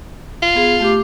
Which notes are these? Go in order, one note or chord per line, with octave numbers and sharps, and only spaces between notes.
F4
B3 G#4
A3 G4 D6